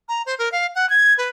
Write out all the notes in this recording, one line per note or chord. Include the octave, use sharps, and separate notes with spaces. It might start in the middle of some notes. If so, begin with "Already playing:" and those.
A#5
C5
A#4
F5
F#5
G#6
B4